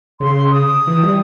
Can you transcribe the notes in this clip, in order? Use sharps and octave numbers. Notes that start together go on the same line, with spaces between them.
C#3 C6
D#6
E3
G3